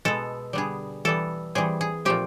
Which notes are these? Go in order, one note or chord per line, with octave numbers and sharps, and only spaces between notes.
B2 G#3 B3 A4
D3 G3 B3 G#4
E3 G3 B3 A4
E3 G3 C4 G#4
G#4
A#2 F3 A3 C4 G4